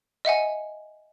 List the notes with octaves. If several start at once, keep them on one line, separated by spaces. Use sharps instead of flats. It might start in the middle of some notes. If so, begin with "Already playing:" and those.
D#5 E5 F#5 G#5